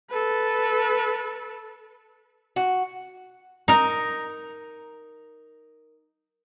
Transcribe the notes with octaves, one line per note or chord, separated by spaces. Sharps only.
A4 B4
F#4
D#4 A#4